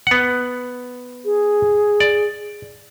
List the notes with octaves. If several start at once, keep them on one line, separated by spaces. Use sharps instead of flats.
B3 F#5
G#4
D5